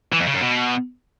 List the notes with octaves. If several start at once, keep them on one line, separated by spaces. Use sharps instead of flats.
E3
F2
C#3
F#2
B2